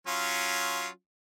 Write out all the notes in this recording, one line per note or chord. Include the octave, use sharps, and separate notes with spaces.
F#3 C#4 F4